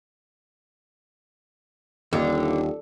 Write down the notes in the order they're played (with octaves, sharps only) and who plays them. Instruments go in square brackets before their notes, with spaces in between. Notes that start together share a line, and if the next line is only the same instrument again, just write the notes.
[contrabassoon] D#1 [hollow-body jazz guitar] D#2 [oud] D3